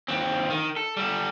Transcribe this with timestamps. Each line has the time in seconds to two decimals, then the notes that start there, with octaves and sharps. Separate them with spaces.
0.08 D#2 C4
0.50 D#3
0.77 A4
0.96 G3 A4